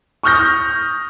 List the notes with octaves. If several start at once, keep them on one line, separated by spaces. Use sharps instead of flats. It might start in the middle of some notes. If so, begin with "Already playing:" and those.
C#6 D#6 F6 G6 A#6